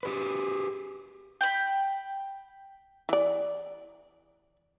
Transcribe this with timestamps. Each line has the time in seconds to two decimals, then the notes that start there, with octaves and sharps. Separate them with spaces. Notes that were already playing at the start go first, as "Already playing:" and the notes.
0.03 G4 G#4 B4
1.41 G5 B5
3.09 E3 D5